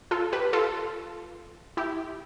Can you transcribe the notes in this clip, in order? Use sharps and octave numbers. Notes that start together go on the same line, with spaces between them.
F4 A4
G4 B4
F4 A4
E4 G4